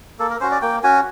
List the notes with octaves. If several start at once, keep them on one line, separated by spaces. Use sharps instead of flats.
A#3 A4
A#4
C#4 F#4 C5
D5
A#3 G5
C#4 F#4 G#5